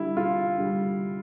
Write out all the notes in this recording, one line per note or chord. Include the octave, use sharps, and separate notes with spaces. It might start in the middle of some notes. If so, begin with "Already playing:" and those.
Already playing: D3 G3 E4
F4
D3 G3